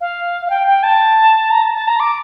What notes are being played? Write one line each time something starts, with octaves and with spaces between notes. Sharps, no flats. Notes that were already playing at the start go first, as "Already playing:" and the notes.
F5
F5
G5
G5
A5
A#5
A5
A5
A#5
D6